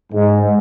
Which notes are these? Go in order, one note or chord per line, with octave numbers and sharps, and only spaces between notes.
G#2